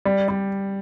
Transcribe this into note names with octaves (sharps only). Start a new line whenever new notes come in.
G3
G3